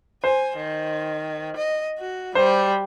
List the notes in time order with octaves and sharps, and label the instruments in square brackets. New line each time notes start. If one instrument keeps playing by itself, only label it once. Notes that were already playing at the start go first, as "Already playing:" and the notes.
[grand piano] C5 [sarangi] G#5
[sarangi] D#3
D#5
F#4
[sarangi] G3 [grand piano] C5